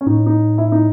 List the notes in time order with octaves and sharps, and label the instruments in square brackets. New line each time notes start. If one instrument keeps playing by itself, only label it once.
[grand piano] C#4
[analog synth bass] A2 [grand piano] D#4
[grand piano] D#4
E4
D#4